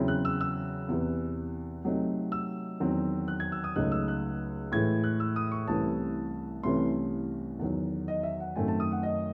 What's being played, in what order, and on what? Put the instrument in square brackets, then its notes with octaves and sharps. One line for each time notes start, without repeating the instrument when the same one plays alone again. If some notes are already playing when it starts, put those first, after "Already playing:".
Already playing: [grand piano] E2 C#3 F#3 C4 E4
F#6
E6
E6
E2 C3 E3
C3 F#3 A3 C4 D#4
E6
E2 D#3 F#3 C4
F#6
G#6
E6
D#6
C#2 C#3 F#3 A3 D#4 F#6
E6
F#6
A2 E3 G#3 G#6
F#6
E6
D#6
C#6
C2 C3 E3 A3 C#4 A5
C2 C3 E3 A3 C#4 C6
E2 D#3 F#3
D#5
E5
F#5
F#2 D#3 A3 C4 G#5
A5
D#6
F#5
D#5